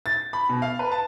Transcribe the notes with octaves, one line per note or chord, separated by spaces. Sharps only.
A6
B5
B2
F5
B4
A5